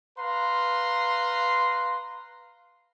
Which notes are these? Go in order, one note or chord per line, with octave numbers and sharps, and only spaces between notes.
B4 F5 A#5 C6